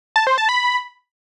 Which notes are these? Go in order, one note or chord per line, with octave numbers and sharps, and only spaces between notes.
A5
C5
A5
B5